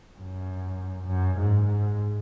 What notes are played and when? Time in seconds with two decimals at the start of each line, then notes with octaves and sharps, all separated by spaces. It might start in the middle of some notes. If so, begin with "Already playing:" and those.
0.19 F#2
1.07 F#2
1.38 G#2
1.67 G#2